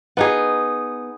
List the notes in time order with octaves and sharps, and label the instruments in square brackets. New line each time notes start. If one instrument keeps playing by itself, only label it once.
[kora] B3 D#4 G#4